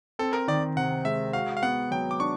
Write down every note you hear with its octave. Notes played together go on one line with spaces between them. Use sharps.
C4 A4
A#4
D#3 D5
C3 F#5
G#3 E5
F#4 F5
F5
B3 F#5
F#3 G5
D6
D4 C#6